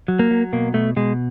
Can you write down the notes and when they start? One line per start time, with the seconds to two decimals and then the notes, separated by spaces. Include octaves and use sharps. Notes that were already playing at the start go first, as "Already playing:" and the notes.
0.08 F#3
0.19 A#3
0.31 F#3
0.53 B2 A#3
0.74 B2 A3
0.96 B2 G#3